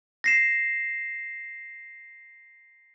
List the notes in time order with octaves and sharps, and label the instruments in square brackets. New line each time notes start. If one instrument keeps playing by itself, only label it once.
[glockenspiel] A#6 C7 E7